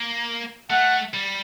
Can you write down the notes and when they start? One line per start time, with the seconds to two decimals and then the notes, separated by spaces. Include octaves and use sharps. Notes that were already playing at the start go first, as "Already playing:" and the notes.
Already playing: A#3
0.70 A3 F#5
1.14 G3